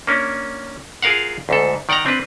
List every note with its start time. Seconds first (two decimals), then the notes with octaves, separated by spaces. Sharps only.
0.07 A#3 C#4 D4
1.03 F4 G#4 A#4 F5 F#5
1.49 D2 G#2 A4
1.89 D#3 D5 F#5 G5 A#5
2.06 C4 D4 B4